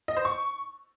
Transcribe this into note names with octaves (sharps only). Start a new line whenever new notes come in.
D#5
C5
C#6